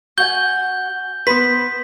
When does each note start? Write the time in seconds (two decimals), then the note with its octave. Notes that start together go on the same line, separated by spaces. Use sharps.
0.18 F#4 F#5 G#5 G6 G7
1.27 B3 B4 C5 B6